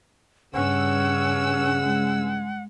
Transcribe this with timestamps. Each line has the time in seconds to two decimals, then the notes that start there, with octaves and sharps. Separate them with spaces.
0.54 G2 C#3 C#4 F#5 E6
1.80 G#3